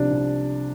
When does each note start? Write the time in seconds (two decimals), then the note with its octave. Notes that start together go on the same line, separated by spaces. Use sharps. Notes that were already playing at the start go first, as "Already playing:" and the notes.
Already playing: C2 C3 F3 D4
0.11 C2